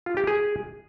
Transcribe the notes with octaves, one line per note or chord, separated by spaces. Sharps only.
F4
G4
G#4